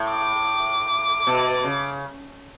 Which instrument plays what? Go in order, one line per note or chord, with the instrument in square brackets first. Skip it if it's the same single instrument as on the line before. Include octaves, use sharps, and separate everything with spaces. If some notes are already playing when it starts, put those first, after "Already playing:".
Already playing: [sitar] A2
[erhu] D6
[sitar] B2
C#3